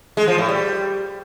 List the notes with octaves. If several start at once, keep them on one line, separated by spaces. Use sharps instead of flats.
G#3
F3
A2
G3